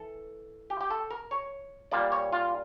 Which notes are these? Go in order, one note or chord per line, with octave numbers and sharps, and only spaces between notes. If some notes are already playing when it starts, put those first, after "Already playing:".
Already playing: E3 A4
G4
G4
A4
A#4
C#5
A#2 G3 A#3 D5
C#5
F4